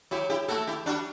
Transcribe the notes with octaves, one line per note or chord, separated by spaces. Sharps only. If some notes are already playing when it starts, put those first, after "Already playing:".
F#3 E4 G4
E4 G4
A3 E4 F#4 A4
E4 G4
G3 D4 F#4